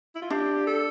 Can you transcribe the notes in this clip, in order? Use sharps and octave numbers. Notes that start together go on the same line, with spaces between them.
E4
F4
D4 G4
A4